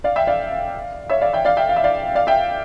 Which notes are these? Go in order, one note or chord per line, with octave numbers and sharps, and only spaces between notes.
D5 F5
E5 G5
D5 F5
C#5 E5
D5 F5
E5 G5
D5 F5
E5 G5
F5
E5
D5 F5
D5 F5
E5 G5